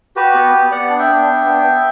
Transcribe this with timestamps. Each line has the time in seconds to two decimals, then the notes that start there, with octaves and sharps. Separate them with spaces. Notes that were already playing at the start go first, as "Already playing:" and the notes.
0.16 F#4 G4 B4
0.35 B3
0.53 B3
0.71 B3 D5 F#5
0.89 D4
0.99 E5 G5
1.08 B3
1.26 D4
1.45 B3
1.63 B3